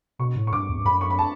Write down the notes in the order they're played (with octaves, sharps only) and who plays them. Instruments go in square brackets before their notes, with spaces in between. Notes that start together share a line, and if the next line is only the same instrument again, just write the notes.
[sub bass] B2 [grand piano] C#6
[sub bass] A2
[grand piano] C#6
[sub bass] G2 [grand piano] D6
[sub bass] E2
G2
[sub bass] F#2 [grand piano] B5
[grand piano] C#6
B5
A5